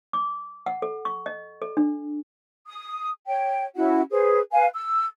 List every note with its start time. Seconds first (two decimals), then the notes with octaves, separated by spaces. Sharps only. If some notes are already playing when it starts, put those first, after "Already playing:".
0.13 D6
0.66 F#5
0.82 A4
1.05 C#6
1.26 D#5
1.62 A4
1.77 D4
2.66 D#6
3.27 C#5 G5
3.75 C#4 E4 F#4 F#5
4.10 G#4 B4 C5
4.51 B4 F5 G#5
4.74 E6